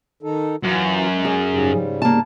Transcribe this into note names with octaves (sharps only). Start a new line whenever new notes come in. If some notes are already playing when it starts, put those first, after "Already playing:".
D#3 D#4 A4
F#2 E3 F4 F#4
G#3
G#4
G#2 C#3 G3
A#3 A5